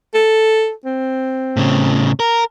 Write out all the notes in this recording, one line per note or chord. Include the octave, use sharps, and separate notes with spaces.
A4
C4
A2 C#3
A#4